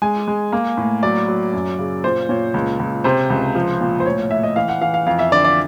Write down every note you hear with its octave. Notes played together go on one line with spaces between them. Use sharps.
G#3 G#5
G#3
A#3
A2
F#3 D5
F#3
F#2
C#3
A#2 C5
A#2 C#5
C#2
C#2
C3 C5
C#2
F3
A#2
C5
A2 C#5
C#5
A2 E5
D#5
E3 F5
F#5
E3 F5
F5
F2 F5
E5
D3 D5
D5